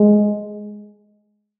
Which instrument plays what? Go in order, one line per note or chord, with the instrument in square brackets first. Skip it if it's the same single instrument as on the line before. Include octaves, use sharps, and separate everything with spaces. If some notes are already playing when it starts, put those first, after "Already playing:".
Already playing: [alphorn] G#3